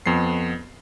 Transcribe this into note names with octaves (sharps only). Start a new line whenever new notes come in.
F2 B3 C7